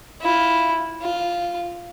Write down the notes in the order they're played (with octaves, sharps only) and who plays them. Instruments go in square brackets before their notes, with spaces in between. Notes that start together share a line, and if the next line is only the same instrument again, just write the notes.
[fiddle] E4 F4
F4